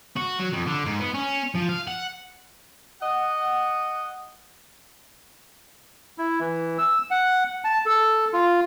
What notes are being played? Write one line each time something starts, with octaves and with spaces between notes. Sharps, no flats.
F#4
F#3
F2
D3
G#2
B3
C#4
F3
F5
F#5
D#5 F#5
E4
E3
E6
F#5
A5
A4
F4